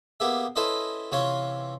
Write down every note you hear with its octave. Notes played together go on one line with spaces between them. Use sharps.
A#3 B3 G4 G#4 E5
C#4 E4 A4 B4 C5 D#5
C3 E3 C#4 F4 C#5 C6